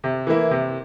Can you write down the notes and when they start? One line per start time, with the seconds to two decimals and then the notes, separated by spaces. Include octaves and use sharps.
0.04 C3
0.27 E3 A#3 E4
0.51 C3